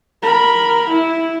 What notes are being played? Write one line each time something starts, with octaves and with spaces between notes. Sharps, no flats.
A#4 B5
E4